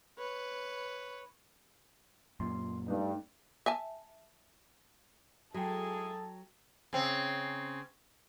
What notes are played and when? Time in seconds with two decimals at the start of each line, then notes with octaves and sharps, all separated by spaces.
0.18 B4 C#5
2.40 F#2 A#2 C6
2.88 G2 A3 D4 D#4
3.66 E5 G#5 A5
5.54 F#3 G#3 E4 F#4 G#4 A4 G5 A5
6.93 C#3 C4